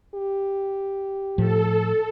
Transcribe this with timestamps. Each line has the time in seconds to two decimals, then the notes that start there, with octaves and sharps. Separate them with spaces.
0.15 G4
1.38 A2 F3 A4